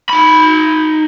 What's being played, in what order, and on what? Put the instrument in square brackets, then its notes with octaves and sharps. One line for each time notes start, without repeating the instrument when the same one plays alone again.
[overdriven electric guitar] D#4 B5